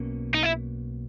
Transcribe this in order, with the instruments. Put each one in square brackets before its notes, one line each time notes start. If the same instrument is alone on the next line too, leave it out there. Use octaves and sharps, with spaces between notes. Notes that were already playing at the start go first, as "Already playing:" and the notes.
Already playing: [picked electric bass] B1 B2 A#3 C#4
[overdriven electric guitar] D#4
E4